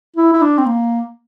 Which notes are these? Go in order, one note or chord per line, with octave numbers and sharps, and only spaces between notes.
E4
E4
D4
C4
A#3